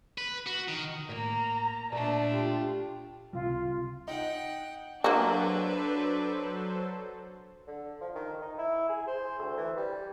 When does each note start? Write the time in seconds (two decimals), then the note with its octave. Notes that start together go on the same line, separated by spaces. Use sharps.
0.18 B4
0.47 F#4
0.68 D#3
1.09 A2 A#3 A#5
1.92 A#2 A3 D4 D5 A5
2.33 F4 G4
3.33 C#2 C3 G3 F4
4.08 D#4 F#5 G5
5.04 F#3 A#3 D4 F#4 A4 B4 C5
7.68 D3
8.01 F3
8.15 D#3
8.42 D#4
8.58 E4
8.89 G#4
9.07 C5
9.39 D2
9.57 E3
9.77 G3